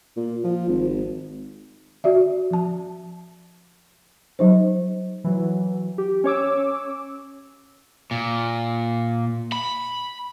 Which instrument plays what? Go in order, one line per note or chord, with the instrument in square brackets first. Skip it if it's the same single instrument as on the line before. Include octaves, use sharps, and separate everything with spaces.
[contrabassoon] A#2
F3
G#1
[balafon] F#4 D5 E5
F3 A5
F#3 D#4 C5
[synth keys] E3 F#3
G4
C#4 C#5 D6 E6
[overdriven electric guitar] A#2
B5